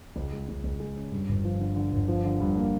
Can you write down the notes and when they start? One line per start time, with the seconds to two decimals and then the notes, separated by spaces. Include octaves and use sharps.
0.16 C#2
0.33 G#3
0.49 C#2
0.64 C#2
0.80 G#3
0.96 C#4
1.12 G2
1.29 G1
1.45 F3
1.60 D3
1.76 D3
1.92 G1
2.08 F3
2.24 D3
2.40 G2
2.56 A#3